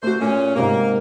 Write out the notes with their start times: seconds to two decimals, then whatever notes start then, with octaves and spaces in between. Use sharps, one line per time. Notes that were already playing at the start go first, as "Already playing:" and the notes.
0.03 A3 F#4 C5
0.20 A#2 A3 C#4
0.56 G#2 C3 A#3